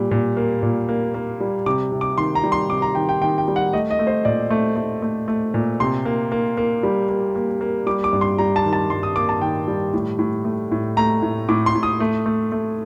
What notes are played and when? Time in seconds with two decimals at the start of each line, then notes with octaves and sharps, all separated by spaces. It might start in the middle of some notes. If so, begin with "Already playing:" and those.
Already playing: A#2 G3
0.11 A#2
0.37 A#3
0.63 A#2
0.89 A#3
1.14 A#3
1.40 G3
1.66 C3 D6
1.92 C3
2.01 D6
2.18 D#3 C6
2.35 A#5
2.44 G3
2.52 C6
2.69 C3 D6
2.82 A#5
2.95 D#3 G5
3.09 G5
3.21 D#3 G5
3.38 G5
3.48 G3
3.56 F#5
3.73 A3 D#5
3.90 D#5
3.99 A3
4.07 C5
4.25 A#2 D5
4.50 A3
4.76 A3
5.02 A3
5.28 A3
5.54 A#2
5.80 C3 C6
6.05 A#3
6.32 A#3
6.57 A#3
6.83 G3
7.09 A#3
7.36 A#3
7.61 A#3
7.86 G3 D6
8.04 D6
8.13 G2
8.21 C6
8.38 G3 A#5
8.56 A5
8.65 D#3
8.73 A5
8.90 G2 C6
9.03 D#6
9.16 A#3 D6
9.29 A5
9.41 D#3 G5
9.68 G3
9.94 A2
10.19 A2
10.45 A3
10.72 A2
10.97 A3 A#5
11.22 A2
11.49 A2 D6
11.66 C6
11.75 A2
11.83 D#6
12.00 A3
12.26 A3
12.52 A3